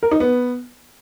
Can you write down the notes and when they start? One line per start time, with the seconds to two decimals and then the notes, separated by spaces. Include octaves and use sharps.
0.03 A#4
0.11 D#4
0.20 B3